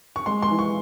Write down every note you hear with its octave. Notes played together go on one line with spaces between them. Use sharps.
C#6
G#3 C6
C6
E3
C#6